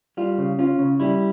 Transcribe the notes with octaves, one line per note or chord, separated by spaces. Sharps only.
G3 F4
C#3
C#4 F4
C#3
G3 E4